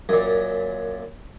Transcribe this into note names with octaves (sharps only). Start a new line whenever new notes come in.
F#2 A#2